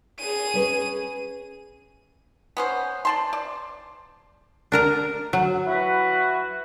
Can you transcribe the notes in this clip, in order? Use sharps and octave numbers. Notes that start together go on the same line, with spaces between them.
G#4 D#7
C#4 B4 C#5
B3 C#4 C5
D5 A5 C6
D5
D4 A#4 A#5
F#3
E4 F#4 B4